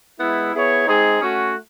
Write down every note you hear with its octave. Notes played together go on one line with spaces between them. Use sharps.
G#3 B3 E4
B3 E4 G#4 C#5
G#3 C4 D#4 G#4
A3 C#4 F#4